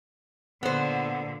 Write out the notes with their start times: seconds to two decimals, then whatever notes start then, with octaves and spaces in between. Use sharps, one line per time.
0.63 A#2 D3 B3 C5